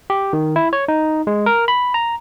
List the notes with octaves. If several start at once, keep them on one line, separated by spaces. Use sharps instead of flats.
G4
D#3
E4
C#5
D#4
G#3
A#4
B5
A#5